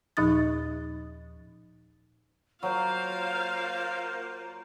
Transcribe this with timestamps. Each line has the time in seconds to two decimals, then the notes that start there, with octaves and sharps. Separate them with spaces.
0.17 D#2 A#2 F3 D#4 D#6 A6
2.63 F#3 A#3 F4 C5 F5